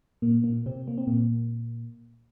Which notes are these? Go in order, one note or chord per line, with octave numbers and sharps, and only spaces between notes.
A#2 A#3
A#2 A#3
C3 C4
A#3
C4
A#2 A#3